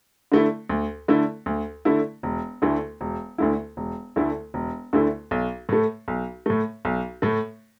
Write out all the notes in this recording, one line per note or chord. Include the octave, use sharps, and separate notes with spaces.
D3 A3 E4
D2
D3 A3 E4
D2
D3 A3 E4
E1
D2 D3 A3 E4
E1
D2 D3 A3 E4
E1
D2 D3 A3 E4
E1
D2 D3 A3 E4
B1
A2 A3
B1
A2 A3
B1
A2 A3